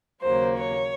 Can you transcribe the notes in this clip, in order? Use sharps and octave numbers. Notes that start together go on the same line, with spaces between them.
D#2 C#3 F#3 A#3 C5
C#5